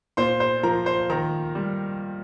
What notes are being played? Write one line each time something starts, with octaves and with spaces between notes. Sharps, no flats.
A#2 C5 C6
C5 C6
F3 A#4 A#5
C5 C6
D#3 A#4 A#5
G3